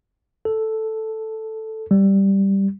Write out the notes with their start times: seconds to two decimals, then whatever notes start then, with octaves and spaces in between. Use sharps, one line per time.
0.45 A4
1.91 G3